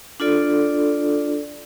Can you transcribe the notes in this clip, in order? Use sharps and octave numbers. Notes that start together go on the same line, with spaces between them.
D4 F4 A4 D5